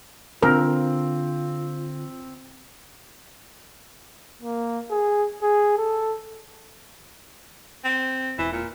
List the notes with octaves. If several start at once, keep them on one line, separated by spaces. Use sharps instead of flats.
D3 C4 F4 A#4
A#3
G#4
G#4
A4
C4
E1 E3
A#2